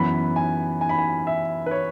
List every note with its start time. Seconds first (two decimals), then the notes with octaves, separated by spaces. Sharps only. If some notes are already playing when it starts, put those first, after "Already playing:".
Already playing: F#2 E3 B3 B5
0.36 G#5
0.81 G#5
0.89 B5
0.98 G#5
1.27 E5
1.66 B4
1.71 C#5